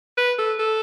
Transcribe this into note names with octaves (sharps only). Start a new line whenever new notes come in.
B4
A4
A4